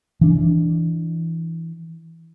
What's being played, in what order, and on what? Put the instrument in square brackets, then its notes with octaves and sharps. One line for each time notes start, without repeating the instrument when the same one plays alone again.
[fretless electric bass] E3 D4